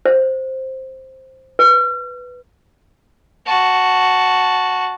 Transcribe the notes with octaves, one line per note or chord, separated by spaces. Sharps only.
C5
B4
F#4 A5